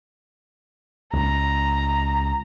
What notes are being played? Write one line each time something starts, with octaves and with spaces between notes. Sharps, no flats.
C#2 A#5